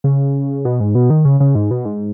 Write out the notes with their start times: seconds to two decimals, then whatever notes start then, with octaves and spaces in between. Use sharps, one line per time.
0.04 C#3
0.65 B2
0.80 G#2
0.95 B2
1.10 D#3
1.25 C#3
1.40 C#3
1.55 G#2
1.71 B2
1.85 G#2